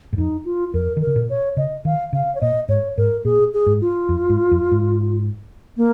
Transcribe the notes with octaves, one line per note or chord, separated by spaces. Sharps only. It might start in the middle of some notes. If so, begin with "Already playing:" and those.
G#2
F2 D#4
F4
F2 A#4
D#3
A#4
C#3
A#2
C#5
C#3 D#5
D#3 F5
C#3 F5
C#5
A#2 D#5
G#2 C#5
G#2 A#4
A#2 G#4
G#4
G#2
F4
F2
G#2
F2
G#2
A#3